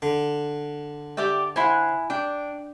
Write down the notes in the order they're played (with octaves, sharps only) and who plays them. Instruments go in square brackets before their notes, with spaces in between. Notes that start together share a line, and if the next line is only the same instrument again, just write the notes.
[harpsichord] D3
[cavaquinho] G4 D5 G5 [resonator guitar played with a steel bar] E5
[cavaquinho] E4 G#5 [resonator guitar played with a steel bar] C5 F#5
[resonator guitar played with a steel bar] D4 [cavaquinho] G5